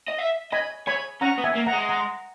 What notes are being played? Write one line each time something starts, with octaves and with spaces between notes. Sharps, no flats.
D#5
E5
D#5 G#5 B5
C#5 G#5 B5
C#4 F#5 A#5
B3
E5 G#5
A#3
F#5 A#5
G#3
F#5 A#5